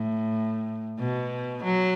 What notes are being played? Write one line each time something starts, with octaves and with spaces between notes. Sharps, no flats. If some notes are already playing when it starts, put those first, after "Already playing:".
Already playing: A2
B2
F#3